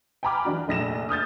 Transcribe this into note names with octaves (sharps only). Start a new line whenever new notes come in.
G5 G#5 A#5 B5 D6 F6
E3 D4 F#4
F1 A#1 A#6 E7
D#6 F6 G6 A6